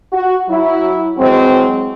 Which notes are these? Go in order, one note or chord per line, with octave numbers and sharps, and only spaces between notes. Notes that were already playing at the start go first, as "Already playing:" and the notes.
F#4
F#3 E4
E3 F#3 G#3 C4